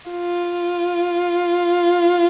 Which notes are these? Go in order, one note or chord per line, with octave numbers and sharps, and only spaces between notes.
F4